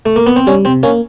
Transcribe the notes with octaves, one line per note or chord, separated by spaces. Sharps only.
A3
A#3
B3
C4
G3 C#4
C3 C4
A#3 C#4